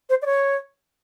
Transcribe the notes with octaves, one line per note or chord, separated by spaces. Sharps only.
C5
D5
C#5